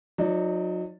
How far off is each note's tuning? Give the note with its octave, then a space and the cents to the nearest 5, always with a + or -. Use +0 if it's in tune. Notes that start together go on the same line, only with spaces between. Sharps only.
F#3 -35 D#4 +0 D5 +0